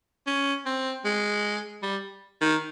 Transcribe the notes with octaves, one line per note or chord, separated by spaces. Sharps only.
C#4
C4
G#3
G3
D#3